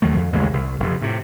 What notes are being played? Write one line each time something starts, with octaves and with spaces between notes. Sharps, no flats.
D#2 D#3 F#3 A3
F2
A1 D#2 C#3 G#3
C2
F1 F2
A2 C3